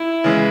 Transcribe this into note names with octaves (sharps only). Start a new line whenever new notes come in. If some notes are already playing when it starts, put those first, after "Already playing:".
Already playing: E4
C#3 E3 G#3